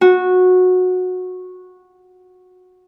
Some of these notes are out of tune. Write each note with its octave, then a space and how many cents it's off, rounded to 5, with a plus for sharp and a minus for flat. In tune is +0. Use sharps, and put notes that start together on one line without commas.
F#4 -15